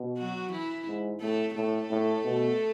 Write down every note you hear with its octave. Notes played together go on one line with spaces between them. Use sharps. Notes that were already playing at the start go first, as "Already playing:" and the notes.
Already playing: B2
F#3 F#4
E3 E4
G#2
A2 A3 A4
A2 A3 A4
A2
B2